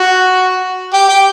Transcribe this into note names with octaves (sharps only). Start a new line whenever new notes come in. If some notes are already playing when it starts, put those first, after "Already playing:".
Already playing: F#4
G4
G4